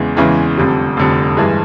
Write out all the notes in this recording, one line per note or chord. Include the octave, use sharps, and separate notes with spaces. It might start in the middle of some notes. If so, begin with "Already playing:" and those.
Already playing: E2 C#3 E3 G#3
E2 C#3 E3 G#3
F1 F2 D3 G3
F1 F2 D3 G3
G2 E3 G#3